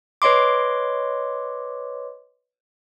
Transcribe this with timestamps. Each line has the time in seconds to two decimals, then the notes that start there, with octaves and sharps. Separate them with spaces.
0.22 B4 C#5 D#5 C6 D6